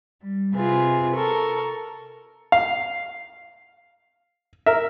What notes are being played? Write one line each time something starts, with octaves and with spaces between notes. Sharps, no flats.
G3
C3 C4 F4 G#4 B4
A4 A#4 C#6
F5
A#4 E5